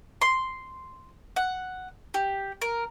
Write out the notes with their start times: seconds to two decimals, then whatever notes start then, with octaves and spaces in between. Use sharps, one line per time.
0.22 C6
1.36 F#5
2.14 G4
2.62 A#4